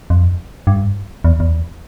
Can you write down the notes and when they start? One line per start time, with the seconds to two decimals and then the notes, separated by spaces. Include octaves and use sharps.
0.10 F2
0.67 G2
1.24 E2
1.40 E2